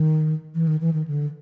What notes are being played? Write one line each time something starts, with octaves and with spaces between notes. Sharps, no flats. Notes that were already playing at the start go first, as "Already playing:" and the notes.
Already playing: D#3
E3
D#3
E3
D#3
D3